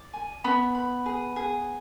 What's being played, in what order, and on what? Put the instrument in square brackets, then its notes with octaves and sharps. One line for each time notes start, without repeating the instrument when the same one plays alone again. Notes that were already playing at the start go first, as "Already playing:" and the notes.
Already playing: [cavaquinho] D5
G#5
[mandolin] B3 [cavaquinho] B5
[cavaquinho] B5
G#4
G#4